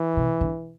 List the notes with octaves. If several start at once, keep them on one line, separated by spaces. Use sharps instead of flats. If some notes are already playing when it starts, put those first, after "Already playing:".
Already playing: E3
C3
D3